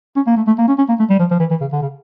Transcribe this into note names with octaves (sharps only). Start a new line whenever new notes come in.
C#4
A#3
A3
A3
A#3
C#4
C#4
A#3
A3
G3
F3
F3
E3
E3
C#3
D3
C#3